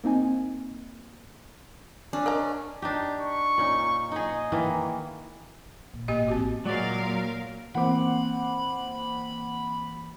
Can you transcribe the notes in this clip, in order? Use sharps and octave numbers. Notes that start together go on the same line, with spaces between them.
A#3 C4 D#4 G#5
C#4 D4
A#4 D#5 A#5
D4 D#4 G4
C#6
A#2 C#4 D#4
D#4 G#4 D#5
D#3 E3 A#3
A#2
A1 A#3 G4 D#5
A1 C4 F#4
A#2 F#3 G#3 A#4 D5 F5
E3 A#3 C4 C5 F#5 B5 D6